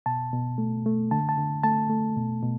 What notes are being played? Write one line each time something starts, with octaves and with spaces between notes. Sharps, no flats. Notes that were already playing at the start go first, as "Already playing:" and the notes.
B2 A5
B2
A3
A3
D3 A5
A5
D3
A3 A5
A3
B2
B2